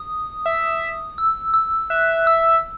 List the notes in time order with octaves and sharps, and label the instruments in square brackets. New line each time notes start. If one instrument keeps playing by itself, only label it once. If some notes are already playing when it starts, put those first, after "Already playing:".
Already playing: [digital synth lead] D#6
[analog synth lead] E5
[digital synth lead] E6
E6
[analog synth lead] E5 [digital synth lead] F#6
[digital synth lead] E6